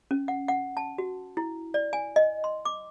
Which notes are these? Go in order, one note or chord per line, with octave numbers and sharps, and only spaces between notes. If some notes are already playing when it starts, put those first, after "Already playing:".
C#4
F#5
F#5
A5
F#4
E4
D5
G#5
D#5
C6
D6